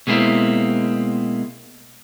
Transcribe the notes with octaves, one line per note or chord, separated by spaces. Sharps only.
B2 G#3 A#3 C4 E4